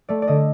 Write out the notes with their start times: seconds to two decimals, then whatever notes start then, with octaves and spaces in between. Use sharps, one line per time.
0.08 A3 D5
0.22 D5
0.27 D3 D#5